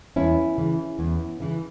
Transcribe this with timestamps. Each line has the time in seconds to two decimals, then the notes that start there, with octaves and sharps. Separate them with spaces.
0.16 E2 C#4 E4
0.58 C#3 E3
0.99 E2
1.40 C#3 E3